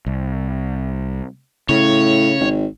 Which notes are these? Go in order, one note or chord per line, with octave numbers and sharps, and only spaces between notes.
C2
A2 C#3 C#5
G#1